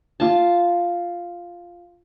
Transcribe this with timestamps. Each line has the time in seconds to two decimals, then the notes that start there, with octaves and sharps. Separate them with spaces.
0.20 F4 A5